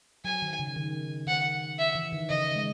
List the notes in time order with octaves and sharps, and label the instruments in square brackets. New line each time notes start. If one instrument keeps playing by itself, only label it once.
[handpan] F#3 [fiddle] G#5
[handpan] D#3
C#3
D#3
[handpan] D#3 [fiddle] F#5
[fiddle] E5
[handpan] E3
D#3
[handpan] C#3 [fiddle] D#5
[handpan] G#3